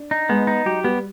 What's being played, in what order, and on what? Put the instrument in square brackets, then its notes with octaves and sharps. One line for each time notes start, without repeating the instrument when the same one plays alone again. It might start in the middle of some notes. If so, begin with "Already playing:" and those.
Already playing: [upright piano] D4
[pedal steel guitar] D#4
[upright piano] G#3 [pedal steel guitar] B3
[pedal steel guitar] D#4
[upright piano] F#3 [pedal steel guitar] G4
[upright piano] G3 [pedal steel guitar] B3